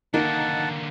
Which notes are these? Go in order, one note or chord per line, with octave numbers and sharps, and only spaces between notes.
D3 D#3 A#3 D#4 F#5 A5